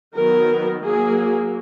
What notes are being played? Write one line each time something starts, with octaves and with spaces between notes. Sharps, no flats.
D#3 F#3 B3 A#4
F#3 A#3 G#4